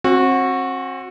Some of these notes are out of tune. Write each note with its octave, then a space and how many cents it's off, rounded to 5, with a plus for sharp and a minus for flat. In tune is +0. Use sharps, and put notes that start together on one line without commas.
C4 +35 F#4 -15